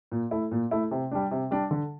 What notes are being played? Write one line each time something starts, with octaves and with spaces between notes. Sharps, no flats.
A#2
A3 E4
A#2
A3 E4
C3
G3 D4
C3
G3 D4
D3